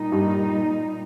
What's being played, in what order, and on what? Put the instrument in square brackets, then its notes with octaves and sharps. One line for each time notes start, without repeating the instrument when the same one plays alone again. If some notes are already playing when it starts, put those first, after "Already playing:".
Already playing: [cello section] A#2 G3 D#4
[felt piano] G2